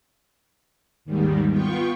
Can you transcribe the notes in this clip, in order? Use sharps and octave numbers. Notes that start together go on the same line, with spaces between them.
D#2 G#2 D#3 G3
B3 F4 G5 C#6